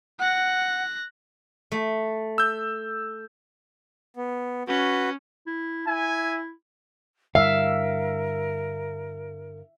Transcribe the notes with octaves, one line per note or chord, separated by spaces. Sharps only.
F#5 F#6 A#6
A3
E6 G6
B3
C#4 F#4 B4
E4
E4 E5 G#5
G2 D3 G3 A#4 E5 F5